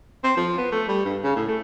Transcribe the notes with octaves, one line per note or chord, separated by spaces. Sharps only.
C4
F3
B3
A3
G3
G2
C#3
A2
A3